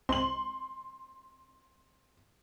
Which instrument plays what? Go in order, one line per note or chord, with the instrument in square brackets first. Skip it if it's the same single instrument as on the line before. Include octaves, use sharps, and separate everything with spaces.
[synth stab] C2 C4 D#5 [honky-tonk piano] C6 F#7